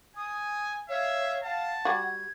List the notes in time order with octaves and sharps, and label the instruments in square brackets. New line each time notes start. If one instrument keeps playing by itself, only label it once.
[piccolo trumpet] G#5 [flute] D#6
[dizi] C#5 [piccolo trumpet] E5 [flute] F5
[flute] F5 [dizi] F#5 [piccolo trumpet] A5
[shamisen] G3 F#4 [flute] G#6